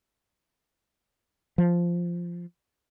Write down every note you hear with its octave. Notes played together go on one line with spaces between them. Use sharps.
F3